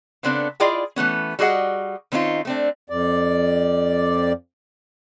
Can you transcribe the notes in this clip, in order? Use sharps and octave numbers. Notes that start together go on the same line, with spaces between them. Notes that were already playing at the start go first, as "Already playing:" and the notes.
C#3 B3 C4 D4 G#4 A4
E4 F4 G#4 D5 D#5 G5
E3 A3 B3 C#4
G3 F#4 G#4 D#5 F#5
D#3 C4 C#4 D#4 F4
A3 C4 D4
F2 D5